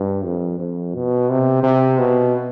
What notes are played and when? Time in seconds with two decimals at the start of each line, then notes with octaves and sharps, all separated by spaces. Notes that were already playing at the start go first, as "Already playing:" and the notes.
Already playing: G2
0.25 F2
0.60 F2
0.95 B2
1.29 C3
1.63 C3
1.98 B2